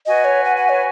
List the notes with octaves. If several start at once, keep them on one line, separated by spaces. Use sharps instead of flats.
F#4 B4 D#5 G#5
C#5
F#5
F#5
C#5